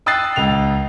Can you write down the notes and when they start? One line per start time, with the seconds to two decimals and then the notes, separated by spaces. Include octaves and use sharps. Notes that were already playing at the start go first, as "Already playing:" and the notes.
0.06 G5 D#6 E6 F#6 A6 C7
0.36 C#2 F7